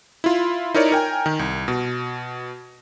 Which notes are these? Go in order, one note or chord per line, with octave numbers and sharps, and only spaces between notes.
E4 F4
D#4 E4 A#4 C#5 D5
A#4 G5 G#5
D#3
C2
B2